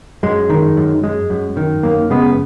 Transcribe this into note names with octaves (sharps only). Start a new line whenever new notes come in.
F#2 G#3
D#3
F#2
G#3
F#2
D#3
F#2 A#3
C#3 G#3 B3